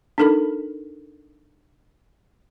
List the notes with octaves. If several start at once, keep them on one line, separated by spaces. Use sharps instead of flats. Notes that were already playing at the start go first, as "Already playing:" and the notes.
D4 D#4 A4 A#4 B5